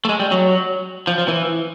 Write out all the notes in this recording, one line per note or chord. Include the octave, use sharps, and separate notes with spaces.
A3
G#3
G3
F#3
F3
F3
E3